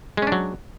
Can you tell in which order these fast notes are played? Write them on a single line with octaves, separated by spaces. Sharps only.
G#3 C#4 D4 F#3